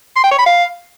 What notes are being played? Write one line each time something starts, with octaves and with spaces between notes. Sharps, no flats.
C6
G5
C#5
B5
F5